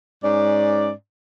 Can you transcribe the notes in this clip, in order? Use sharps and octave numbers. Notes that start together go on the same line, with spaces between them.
G#2 C#4 D5